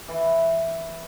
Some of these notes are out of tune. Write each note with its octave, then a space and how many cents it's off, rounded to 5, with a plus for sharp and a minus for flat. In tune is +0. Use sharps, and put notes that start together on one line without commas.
E3 +0 B4 +0